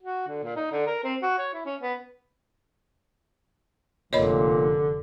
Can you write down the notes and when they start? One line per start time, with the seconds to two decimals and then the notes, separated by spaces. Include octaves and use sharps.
0.02 F#4
0.28 D3
0.44 A#2
0.56 D#4
0.71 D3
0.87 A#4
1.04 C4
1.22 F#4
1.38 C#5
1.53 E4
1.66 C#4
1.82 B3
4.13 F1 A#2 D3 C#5 D#5 B5